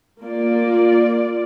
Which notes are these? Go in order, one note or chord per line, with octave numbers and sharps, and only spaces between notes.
A#3 F4 D5